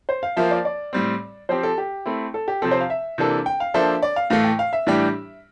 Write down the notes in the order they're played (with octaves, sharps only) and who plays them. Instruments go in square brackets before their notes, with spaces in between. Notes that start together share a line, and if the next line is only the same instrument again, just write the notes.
[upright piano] C5
F5
[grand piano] F3 A#3 F4 C5 [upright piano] E5
[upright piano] D5
D5
[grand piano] A2 G3 C4
[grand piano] F3 C4 G4 [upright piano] C5
[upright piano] A4
G4
[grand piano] A3 C4 E4
[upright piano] A4
G4
[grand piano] C3 F3 C4 [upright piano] A4
[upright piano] C5
F5
E5
[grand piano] C3 E3 A#3 D4 A4
[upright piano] G5
F5
[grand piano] F3 A#3 D4 A4 C5 [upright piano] E5
[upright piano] D5
F5
[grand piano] A2 E3 A3 [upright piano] F5
[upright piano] G5
F5
E5
[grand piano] A2 E3 G3 D4 G4